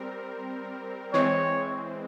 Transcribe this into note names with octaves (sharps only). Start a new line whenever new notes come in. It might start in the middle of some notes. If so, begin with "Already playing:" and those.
Already playing: G3 C4 A#4
E3 G#3 C4 C#5